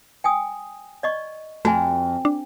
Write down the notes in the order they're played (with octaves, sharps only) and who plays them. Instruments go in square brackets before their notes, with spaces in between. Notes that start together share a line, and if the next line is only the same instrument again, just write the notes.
[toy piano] G5 G#5 D#6
D5 D#5 C#6
[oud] F2 [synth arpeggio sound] A3 [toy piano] F#4 G#5
[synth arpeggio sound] D4